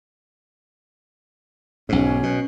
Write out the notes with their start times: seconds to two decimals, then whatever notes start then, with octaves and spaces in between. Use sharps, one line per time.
1.89 B1 G#2 C#4
2.23 B2